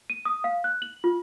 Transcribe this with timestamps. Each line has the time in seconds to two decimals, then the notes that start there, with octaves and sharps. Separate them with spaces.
0.10 D#7
0.25 D#6
0.44 F5
0.64 F#6
0.82 F#7
1.04 F4